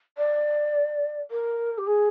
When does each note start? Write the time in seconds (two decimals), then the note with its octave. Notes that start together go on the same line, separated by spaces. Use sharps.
0.18 D5
1.31 A#4
1.78 G4
1.87 G#4